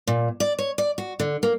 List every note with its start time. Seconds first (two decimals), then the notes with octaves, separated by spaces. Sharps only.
0.07 A#2
0.40 D5
0.59 C#5
0.78 D5
0.98 F#4
1.20 D3
1.43 A#3